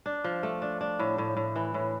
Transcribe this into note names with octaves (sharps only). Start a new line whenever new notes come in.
D4
F3
A3
D4
D4
A2
A2
A2
E3
A2